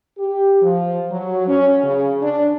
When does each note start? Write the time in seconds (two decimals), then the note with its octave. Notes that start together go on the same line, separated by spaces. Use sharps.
0.19 G4
0.62 F3
1.11 F#3
1.47 C#4
1.83 C#3
2.22 D4